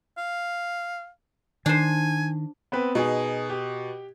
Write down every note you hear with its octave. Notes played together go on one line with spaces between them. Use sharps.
F5
D#3 D4 C5 G#5
B3 C4 B4
B2 D#4 G#4
G4